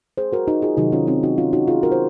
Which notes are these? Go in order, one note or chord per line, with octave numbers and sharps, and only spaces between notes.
G#4 C5
F#4 A#4
D#4 F#4
F4 G#4
C3 D#3 F#3 D#4 F#4
C#4 F4
C4 D#4
D#4 F#4
C#4 F4
D#4 F#4
F4 G#4
F#4 A#4
C5